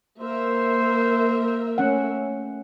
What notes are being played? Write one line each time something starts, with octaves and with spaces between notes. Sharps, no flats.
A#3 A#4 C5 E5
A3 C#4 F#5